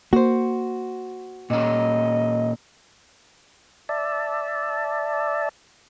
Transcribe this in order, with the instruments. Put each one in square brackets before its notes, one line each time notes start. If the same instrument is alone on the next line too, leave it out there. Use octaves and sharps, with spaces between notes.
[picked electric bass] A#3 [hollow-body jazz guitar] F#4 C5
[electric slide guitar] A#2 C#4 [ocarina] D#5
[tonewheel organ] D5 E5 A5